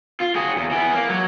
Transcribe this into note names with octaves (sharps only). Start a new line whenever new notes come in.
F4
F#4 G#4
E2
E3 B3
A#3
F#3